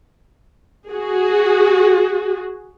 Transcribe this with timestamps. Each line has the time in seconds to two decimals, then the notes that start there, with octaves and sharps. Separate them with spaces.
0.89 F#4 G#4